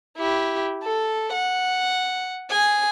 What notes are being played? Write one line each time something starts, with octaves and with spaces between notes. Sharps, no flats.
E4 G4
A4
F#5
G#4 G#5